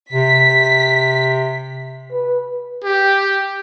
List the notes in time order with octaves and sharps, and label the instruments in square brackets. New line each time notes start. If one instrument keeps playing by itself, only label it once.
[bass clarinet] C3 [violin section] B6
[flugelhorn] B4
[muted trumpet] G4